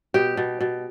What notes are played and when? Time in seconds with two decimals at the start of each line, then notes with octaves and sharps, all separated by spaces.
0.14 B2 G4
0.37 B2
0.61 B2